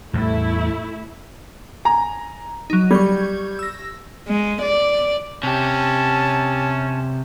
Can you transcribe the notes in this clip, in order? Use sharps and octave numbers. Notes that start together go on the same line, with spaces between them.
E2 A2 G3 A3 E4
G#5 A#5
F#3 D#4
G3 C#6 G6 G#6
E6 A#6
G#3
D5
C3 C#4 G4 A5